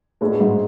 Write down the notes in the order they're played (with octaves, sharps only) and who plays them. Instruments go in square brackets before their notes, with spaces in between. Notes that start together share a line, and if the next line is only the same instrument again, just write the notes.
[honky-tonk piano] A2 [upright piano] G#3 B3 D4 F#4
[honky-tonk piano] G#2